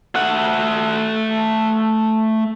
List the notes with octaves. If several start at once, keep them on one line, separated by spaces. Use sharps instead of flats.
A3 F#5